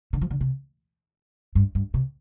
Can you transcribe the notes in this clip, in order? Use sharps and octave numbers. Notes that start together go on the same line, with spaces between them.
D3
F3
D3
C3
G2
G2
C3